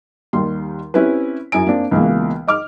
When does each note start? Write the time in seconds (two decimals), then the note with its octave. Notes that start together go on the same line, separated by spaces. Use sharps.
0.33 D#2 D#3 G3 C6
0.94 C4 C#4 E4 G4 B4
1.52 F#2 E4 G#5 D7
1.67 A#3 C4 D4
1.91 C#2 B2 E3 G#3 A#3
2.47 D#5 D6 F6